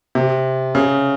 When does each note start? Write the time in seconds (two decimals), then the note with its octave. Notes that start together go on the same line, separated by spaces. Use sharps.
0.15 C3
0.75 C#3